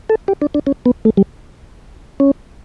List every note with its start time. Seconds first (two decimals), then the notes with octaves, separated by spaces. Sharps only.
0.10 A4
0.28 G4
0.42 D4
0.54 D4
0.67 C#4
0.86 B3
1.05 A3
1.17 G3
2.20 C#4